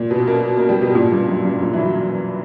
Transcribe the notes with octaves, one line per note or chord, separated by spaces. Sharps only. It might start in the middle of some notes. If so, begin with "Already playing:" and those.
Already playing: A#2
B2
A#3
A#3
G3
B2
A#2
G2
F#2
G2
A#2
E3
F#3